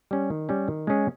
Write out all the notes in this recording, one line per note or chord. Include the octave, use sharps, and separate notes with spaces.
G3 C#4
D#3
G3 C#4
D#3
G#3 C#4 G#4